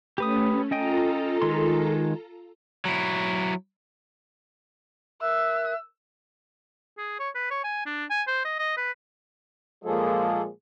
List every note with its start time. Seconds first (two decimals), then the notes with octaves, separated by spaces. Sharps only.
0.18 A3 C#4 G4 B4 D#6
0.71 C#4 F4 A4 D#5 G5 A#5
1.42 D#3 G#3 C6
2.85 F#3 E4
5.21 A#4 E5 E6 F#6
6.98 G#4
7.20 C#5
7.35 B4
7.51 C#5
7.64 G#5
7.86 D4
8.10 G#5
8.27 C5
8.45 D#5
8.59 D#5
8.77 B4
9.85 A#2 F3 G#3 A#3 G#4 A4